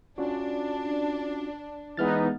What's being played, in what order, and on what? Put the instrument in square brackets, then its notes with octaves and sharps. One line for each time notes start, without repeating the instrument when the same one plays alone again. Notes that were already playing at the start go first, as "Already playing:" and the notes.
[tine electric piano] C#4 F4 F#4 [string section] D4
[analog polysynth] E3 B3 D#4 [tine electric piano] G#3 F6 A6